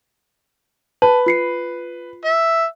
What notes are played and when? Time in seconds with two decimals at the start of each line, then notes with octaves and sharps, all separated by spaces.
1.02 B4 A5
1.26 F4 C7 C#7
2.25 E5